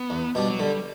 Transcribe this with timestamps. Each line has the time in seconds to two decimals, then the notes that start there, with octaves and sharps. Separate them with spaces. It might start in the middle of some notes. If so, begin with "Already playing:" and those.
Already playing: B3
0.10 E2
0.35 B2 G3 D4
0.50 F#3
0.59 D3 G3